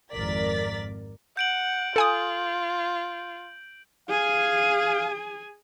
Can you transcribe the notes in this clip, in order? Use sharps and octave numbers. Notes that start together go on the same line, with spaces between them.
G#1 F2 A#4 D5 A6 B6
F#5 G6 D7 F#7
F4 A4 G#5 D#6
G#4 F5 G#5